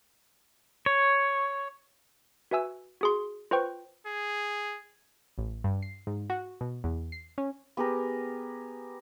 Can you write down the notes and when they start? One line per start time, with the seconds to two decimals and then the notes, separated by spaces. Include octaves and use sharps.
0.86 C#5
2.51 F#4 B4 E5 G#5 E6
3.01 F#4 G#4 C6
3.51 F4 B4 C5 G5 C#6
4.07 G#4
5.38 A1
5.64 G2
5.83 C7
6.07 G#2
6.30 F#4
6.61 B2
6.84 E2
7.12 C7
7.38 C#4
7.77 B3 G4 G#4 A#4